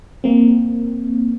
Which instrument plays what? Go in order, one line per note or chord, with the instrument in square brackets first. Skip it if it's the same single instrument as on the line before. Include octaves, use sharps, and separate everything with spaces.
[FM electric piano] A#3 C4